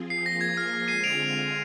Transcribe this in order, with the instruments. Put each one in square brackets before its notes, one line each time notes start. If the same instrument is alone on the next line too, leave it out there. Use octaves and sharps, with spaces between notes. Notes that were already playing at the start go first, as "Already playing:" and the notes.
Already playing: [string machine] F3 C4 F4 G#4
[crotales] C7
[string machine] F3 A#3 F4 G#4 [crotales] A#6
[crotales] G#6
F6
[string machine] D3 G#3 C4 F4 G#4 [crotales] C7 D#7
[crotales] D7 F7